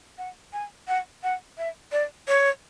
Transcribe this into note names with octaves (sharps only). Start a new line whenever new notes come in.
F#5
G#5
F#5
F#5
E5
D5
C#5